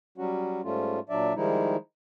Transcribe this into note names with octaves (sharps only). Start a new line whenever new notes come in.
F#3 G3 C#4 F#4
G#2 G3 A3 C#4 F4
A#2 F#3 D4 D5 E5
D#3 F3 G3 G#3 D#4 E4